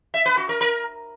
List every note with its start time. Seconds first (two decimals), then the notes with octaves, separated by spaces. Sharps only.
0.14 E5
0.26 B4
0.37 F#4
0.49 A#4
0.61 A#4